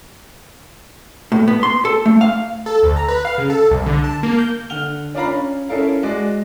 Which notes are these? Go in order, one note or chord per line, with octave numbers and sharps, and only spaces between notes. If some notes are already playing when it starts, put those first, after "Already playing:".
A2
B3
C6
A4
A3
F5
A4
D2
A#5
B4
F5
C#3
A4
C2
D3
A5
A#3
G6
D3 F#5 F6 F7 G7
C#4 D4 F4 F5 A#5 B5
C#4
C#4 E4 A4 A#4 F5
G#3 F#4 D5